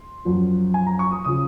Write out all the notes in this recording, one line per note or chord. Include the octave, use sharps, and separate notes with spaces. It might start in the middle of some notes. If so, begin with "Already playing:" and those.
Already playing: C6
F#2 F3
G#5
A#5
C#6
D#6
C#3 F3 D#6